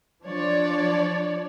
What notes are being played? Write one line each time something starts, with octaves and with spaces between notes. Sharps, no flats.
F3 D4 C#5 D5